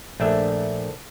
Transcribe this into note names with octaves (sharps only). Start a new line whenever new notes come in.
A#1 A3 D4 E5